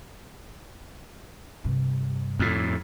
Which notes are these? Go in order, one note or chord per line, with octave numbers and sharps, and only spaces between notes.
G2 C3
F2 A2